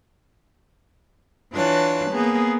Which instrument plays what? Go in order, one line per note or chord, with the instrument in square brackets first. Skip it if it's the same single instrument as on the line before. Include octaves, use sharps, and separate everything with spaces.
[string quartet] E3 D4 F4 B4 C#5 A5
A#3 B3 G#4